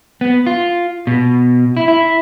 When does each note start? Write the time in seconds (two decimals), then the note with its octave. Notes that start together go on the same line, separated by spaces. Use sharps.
0.21 B3
0.47 F4
1.07 B2
1.77 E4
1.88 E4